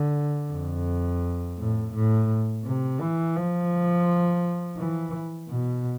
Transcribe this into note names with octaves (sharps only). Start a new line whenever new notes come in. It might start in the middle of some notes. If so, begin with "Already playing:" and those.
Already playing: D3
F2
A2
A2
C3
E3
F3
E3
B2